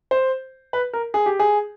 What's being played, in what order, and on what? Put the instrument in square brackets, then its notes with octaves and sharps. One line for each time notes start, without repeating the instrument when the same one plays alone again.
[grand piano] C5
B4
A#4
G#4
G4
G#4